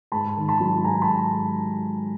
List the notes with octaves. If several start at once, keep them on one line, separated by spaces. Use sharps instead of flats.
G#2 A5 B5
D#3
A5 B5
F#3
G#2 G#5 A#5
A5 B5